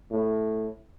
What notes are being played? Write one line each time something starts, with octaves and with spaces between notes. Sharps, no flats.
A2